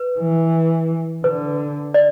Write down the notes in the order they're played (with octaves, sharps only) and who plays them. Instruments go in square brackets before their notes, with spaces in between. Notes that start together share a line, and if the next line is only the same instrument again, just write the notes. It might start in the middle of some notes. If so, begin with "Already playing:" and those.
Already playing: [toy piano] B4
[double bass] E3
[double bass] D3 [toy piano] B4
[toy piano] D5